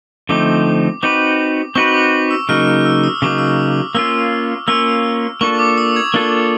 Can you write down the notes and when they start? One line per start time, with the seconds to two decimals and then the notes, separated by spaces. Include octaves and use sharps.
0.29 D3 F3 A3 C4 D#4 D6
1.03 C4 D#4 F#4 B4 D6
1.75 C4 D#4 F#4 B4 C#6
1.94 D6
2.31 E6
2.49 C#3 F#3 A#3 D#4 F6
2.67 F6
2.85 E6
3.03 D#6
3.22 C#3 F#3 A#3 D#4 D6
3.38 E6
3.46 D#6
3.70 D6
3.95 A#3 C#4 F4 E6
4.68 A#3 C#4 F4 E6
5.41 A#3 D4 F4 A4 C#6
5.59 D6
5.78 D#6
5.96 G#6
6.14 A#3 D4 F4 A4